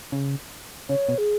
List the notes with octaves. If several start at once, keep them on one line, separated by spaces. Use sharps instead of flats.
C#3
C#3 C#5
B2
G#4